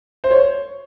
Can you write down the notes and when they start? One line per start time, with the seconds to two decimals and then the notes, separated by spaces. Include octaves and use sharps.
0.24 C5
0.31 C#5